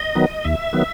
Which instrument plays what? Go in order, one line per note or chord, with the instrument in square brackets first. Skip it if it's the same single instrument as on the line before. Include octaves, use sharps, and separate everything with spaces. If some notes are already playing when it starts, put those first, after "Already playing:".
Already playing: [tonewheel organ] D#5
D#3 F#3 B3
D#2 E5
D#3 F#3 B3